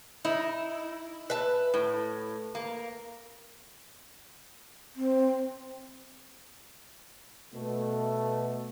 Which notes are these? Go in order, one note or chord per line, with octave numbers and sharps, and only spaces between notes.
D#4 E4
B4 E5 A5
A2
A#3
C4
B2 A3